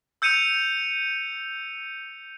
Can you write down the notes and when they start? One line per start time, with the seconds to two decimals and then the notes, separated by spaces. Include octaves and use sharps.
0.22 E6 G6 C#7 D#7 F7